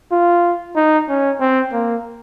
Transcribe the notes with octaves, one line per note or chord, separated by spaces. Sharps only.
F4
D#4
C#4
C4
A#3